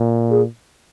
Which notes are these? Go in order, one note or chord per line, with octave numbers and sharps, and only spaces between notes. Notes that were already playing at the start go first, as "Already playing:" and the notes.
Already playing: A#2
G#4